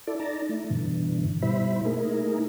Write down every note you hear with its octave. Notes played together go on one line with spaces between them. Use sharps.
E4 A4 D5
D#4 D5 A5 A#5
A3 E4
G2 B2 D3 E3
B2 G3 E4 C5 E5 B5
A3 A#3 D#4 E4 G#4 A#4